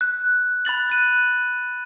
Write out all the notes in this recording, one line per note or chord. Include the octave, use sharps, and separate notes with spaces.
F#6
B5 F#6 A6 F#7
F#6 D#7